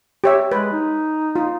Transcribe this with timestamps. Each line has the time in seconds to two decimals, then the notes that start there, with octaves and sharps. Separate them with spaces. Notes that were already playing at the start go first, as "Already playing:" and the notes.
0.24 G4 C#5 E5
0.52 G#3 B4
0.72 D#4
1.36 F4